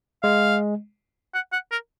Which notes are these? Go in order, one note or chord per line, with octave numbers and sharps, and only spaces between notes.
G#3 F5
F#5
F#5
A#4